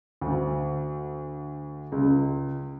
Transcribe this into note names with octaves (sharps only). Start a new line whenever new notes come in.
D2
C#2